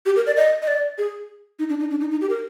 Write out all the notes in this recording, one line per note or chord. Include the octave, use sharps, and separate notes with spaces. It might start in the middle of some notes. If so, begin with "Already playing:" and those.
G4
A#4
D5
D#5
D#5
D5
G#4
D#4
D4
D#4
D4
D#4
D#4
G4
A#4